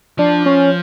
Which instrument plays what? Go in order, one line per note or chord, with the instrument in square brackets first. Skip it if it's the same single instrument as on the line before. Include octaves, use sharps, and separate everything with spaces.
[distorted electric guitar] F3 [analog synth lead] D4
[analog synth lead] C#4